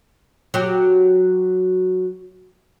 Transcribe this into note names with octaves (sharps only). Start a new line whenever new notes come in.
F#3 F#4 G4